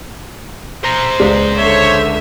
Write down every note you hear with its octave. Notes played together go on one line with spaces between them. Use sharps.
C5 A#5
C#2 G#3 D5
D3 C#5 E5